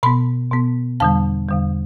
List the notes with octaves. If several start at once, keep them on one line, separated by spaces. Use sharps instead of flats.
B2 B3 B5
B2 B3
E2 D3 G3 A5
E2 D3 G3